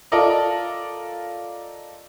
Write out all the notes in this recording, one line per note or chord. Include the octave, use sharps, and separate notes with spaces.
F4 A4 A#4 D5 D#5